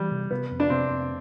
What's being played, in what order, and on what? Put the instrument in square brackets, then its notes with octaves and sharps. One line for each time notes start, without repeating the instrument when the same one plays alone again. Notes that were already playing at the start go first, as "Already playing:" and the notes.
Already playing: [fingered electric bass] E3 [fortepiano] G3
[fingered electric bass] C3
[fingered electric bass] C3 [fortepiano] B3
[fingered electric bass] F2
[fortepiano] D4
[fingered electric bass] C3 [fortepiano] C4
[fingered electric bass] F2